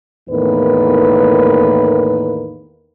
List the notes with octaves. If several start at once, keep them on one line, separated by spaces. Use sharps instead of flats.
E2 A2 D#3 A#3 B4